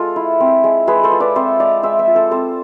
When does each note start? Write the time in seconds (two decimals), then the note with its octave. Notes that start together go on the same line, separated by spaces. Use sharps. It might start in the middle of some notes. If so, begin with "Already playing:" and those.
Already playing: G#3 F4 A4
0.16 E4
0.40 C4
0.64 G#3
0.87 G#3 G#4 B4
1.03 A4 C5
1.11 F4
1.20 B4 D5
1.35 C4 C5 E5
1.60 G#3 D5 F5
1.83 G#3 C5 E5
1.99 C5 E5
2.07 F4
2.15 A4 C5
2.31 C4 A4 C5